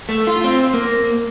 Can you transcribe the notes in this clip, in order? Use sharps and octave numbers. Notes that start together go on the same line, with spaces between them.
A3
F4
C4
A#3